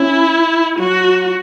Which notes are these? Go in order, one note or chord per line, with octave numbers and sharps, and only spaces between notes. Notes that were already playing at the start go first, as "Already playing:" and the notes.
Already playing: C#4 E4
F#3 F#4